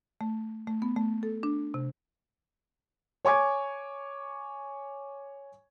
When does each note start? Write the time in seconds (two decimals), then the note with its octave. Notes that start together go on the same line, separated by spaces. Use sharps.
0.21 A3
0.68 A3
0.82 B3
0.96 A3
1.23 A4
1.43 D4
1.74 C3
3.25 C#5 G#5 C#6 D6 G#6